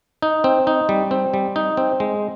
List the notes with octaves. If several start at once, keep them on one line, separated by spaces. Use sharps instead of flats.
D#4
C4
D#4
G3
C4
G3
D#4
C4
G#3